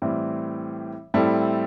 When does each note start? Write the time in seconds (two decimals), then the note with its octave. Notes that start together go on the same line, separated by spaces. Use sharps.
0.02 A2 E3 G3 C4
1.14 A2 G3 C4 E4 A4